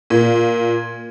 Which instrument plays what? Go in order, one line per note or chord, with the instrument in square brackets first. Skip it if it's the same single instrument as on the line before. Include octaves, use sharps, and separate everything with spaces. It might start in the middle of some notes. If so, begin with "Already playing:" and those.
[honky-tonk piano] A#2